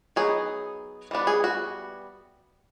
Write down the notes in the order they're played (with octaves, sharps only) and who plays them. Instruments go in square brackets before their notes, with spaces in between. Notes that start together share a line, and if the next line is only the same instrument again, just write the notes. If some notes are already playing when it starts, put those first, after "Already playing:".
[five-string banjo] F#3 B3 D#4 G#4
E3 G3 B3 D4
G#4
F#4